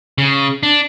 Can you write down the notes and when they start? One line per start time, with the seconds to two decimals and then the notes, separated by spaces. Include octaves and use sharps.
0.18 C#3
0.63 D4